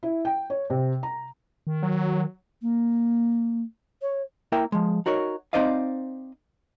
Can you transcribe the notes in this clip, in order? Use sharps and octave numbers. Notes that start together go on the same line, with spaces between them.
E4
G5
C#5
C3
A#5
D#3
F#3
A#3
C#5
A#3 E4 A#4 E5 G5
F3 G#3
D#4 F#4 A#4 C#5
C4 D#4 C5 D5 D#5 F5